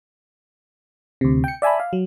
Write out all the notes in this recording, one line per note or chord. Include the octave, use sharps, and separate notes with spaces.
D2 C3
G5 C#7
D5 E5 G#5 A5 B5
F5
F#3